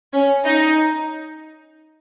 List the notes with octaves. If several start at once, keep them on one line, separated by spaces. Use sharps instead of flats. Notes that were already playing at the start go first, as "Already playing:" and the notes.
C#4
D#4